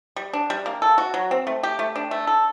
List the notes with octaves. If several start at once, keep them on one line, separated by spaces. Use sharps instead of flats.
G3
D4
G3
A#3
A4
F#4
F#3
C4
A3
G4
A3
D4
A3
A4